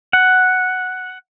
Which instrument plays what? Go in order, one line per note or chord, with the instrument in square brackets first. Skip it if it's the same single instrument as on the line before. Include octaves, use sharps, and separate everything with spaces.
[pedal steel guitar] F#5